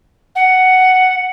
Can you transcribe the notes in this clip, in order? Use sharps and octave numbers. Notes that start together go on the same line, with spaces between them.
F#5